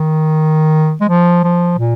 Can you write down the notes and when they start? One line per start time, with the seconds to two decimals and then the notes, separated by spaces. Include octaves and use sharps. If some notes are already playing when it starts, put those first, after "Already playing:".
Already playing: D#3
1.01 G#3
1.09 F3
1.44 F3
1.78 A#2